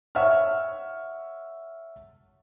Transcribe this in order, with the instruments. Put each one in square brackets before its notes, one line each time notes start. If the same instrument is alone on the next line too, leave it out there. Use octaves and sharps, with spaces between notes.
[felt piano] C#5 E5 F#5 C#6 F6